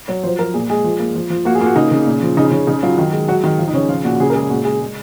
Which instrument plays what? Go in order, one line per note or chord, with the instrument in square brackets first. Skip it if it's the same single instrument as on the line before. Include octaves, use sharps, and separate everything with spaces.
[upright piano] F#3 C#5
F3 C5
F3 A#4
A#2 G#4
G#3 G#4
F3
A#3
F3
F3
A#3 F#4
G#4
A#3 F4
F#4
C#3 D#4
C#3
A#2
F3
C#3 D#4
C#3 C#4
C#3 D#4
F#3 F4
D#3
G#3
F#3 F#4
D#3
F3 F4
D#4
C#3 C#4
F3 F4
A#2 F#4
F#4
C#3 G#4
A#4
G#3 G#4
A#2 F#4
G#3 G#4
G#3